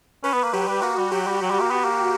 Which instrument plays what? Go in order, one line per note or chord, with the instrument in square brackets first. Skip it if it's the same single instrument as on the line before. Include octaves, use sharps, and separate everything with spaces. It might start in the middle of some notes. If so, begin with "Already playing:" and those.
[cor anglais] C#4 [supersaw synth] B4
[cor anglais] B3
A#3
[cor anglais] F#3 [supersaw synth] G4
[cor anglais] G3
[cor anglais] A#3 [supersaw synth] F#4
[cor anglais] G3
[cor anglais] F#3 [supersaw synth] G4
[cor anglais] G3
F#3
G3
A#3
B3
A#3